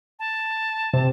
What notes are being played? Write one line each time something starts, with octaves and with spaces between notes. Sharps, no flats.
A5
C3